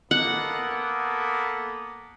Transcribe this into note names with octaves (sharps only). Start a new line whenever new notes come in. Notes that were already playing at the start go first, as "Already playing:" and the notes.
A#3 B3 A4 F#5